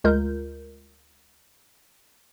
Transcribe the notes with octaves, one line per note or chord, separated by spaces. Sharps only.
D2 G#3 F4 A#4 G6